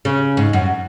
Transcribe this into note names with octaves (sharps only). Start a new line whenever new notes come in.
C#3
G#2
F#2